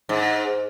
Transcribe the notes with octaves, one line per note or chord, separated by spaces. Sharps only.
G#2